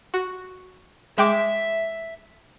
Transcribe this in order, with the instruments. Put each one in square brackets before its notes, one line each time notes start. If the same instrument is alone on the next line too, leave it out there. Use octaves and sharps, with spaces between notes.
[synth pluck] F#4
[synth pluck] G#3 G5 D6 [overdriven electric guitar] E5